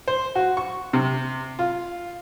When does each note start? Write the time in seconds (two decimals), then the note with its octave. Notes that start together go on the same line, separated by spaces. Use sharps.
0.08 C5
0.36 F#4
0.57 C#6
0.93 C3
1.59 F4